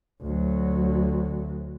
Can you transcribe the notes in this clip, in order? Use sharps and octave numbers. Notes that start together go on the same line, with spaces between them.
D2 F#3